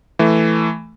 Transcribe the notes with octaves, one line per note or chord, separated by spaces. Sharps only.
E3 A3